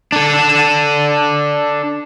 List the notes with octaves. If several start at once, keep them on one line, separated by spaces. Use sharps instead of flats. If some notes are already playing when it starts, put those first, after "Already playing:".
D4 A4